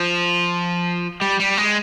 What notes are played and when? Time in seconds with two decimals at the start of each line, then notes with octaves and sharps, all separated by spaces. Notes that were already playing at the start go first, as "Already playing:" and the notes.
Already playing: F3
1.21 G3
1.40 G3
1.58 G#3